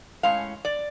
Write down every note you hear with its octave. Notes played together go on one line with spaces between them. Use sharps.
A2 G#3 C#4 F5
D5